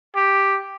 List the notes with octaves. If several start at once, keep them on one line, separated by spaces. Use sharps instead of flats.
G4